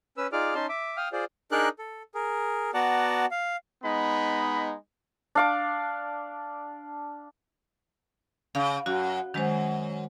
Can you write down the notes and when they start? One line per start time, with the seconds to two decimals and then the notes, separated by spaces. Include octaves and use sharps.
0.17 C#4 B4 E6
0.32 D#4 F4 G#4 D5 D6 F6
0.55 C#4 D#4 A5 C6
0.69 E5 D6
0.97 F5 G5 D#6 F6
1.13 F4 G#4 C5 D5
1.51 D4 D#4 G#4 A#4 D5 F#6
1.79 A4
2.14 G#4 A#4
2.74 B3 F#4 D5 F#5 A5 A#5
3.31 F5
3.83 G#3 B3 D#4 B5
5.35 D4 F5 D6
8.55 C#3 F5
8.86 F#2 F#4
9.34 F#2 D#3 G#3 C5